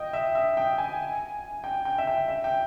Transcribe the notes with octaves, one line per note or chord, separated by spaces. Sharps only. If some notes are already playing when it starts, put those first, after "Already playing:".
Already playing: D#5 G5
E5
E5
G5
G#5
G5
G5
E5
G5
E5
G5